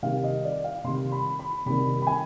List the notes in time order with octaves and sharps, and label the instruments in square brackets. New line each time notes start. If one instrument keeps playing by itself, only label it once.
[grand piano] C3 D#3 G3 F5
D#5
D5
F5
C3 D#3 G3 C6
B5
B5
C3 D#3 G3 B5
B5
G#5